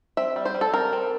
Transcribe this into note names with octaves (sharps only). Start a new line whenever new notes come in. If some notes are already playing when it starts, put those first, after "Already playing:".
C4 E5
G3
C5
G3
A4
C4 A#4
C4